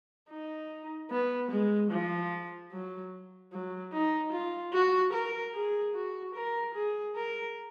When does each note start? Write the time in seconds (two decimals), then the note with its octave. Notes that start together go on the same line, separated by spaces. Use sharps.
0.30 D#4
1.11 B3
1.51 G#3
1.91 F3
2.72 F#3
3.52 F#3
3.93 D#4
4.32 F4
4.73 F#4
5.13 A#4
5.54 G#4
5.94 F#4
6.35 A#4
6.74 G#4
7.15 A#4